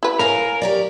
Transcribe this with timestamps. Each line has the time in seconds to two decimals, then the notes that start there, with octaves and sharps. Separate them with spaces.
0.03 E4 B4
0.19 A#4 C#5 F5 G#5
0.62 G4 C#5 D5